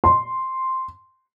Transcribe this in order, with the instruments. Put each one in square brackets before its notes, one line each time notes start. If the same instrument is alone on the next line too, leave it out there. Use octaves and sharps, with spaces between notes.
[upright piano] C6